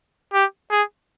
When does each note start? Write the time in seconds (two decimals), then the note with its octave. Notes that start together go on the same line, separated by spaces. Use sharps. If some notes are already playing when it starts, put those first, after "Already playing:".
0.33 G4
0.71 G#4